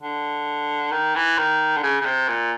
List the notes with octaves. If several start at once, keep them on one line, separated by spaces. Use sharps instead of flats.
D3
D#3
E3
D#3
D3
C#3
C#3
C3
A#2